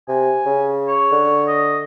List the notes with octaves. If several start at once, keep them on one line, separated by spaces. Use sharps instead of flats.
C3 G#5
C#3
C#5
D3
D#5